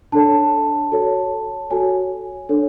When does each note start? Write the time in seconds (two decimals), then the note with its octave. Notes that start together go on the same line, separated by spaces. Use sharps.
0.12 D4 A4 C#5 A5
0.92 F#4 A4 C#5
1.70 F#4 A4 C#5 G#5
2.49 D4 A4 C#5